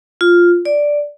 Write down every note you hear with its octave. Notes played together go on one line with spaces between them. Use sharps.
F4
D5